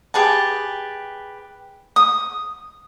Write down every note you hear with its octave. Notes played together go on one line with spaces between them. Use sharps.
G4 G#4 B4 A5
D#6